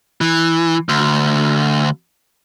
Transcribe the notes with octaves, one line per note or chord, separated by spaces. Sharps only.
E3
D2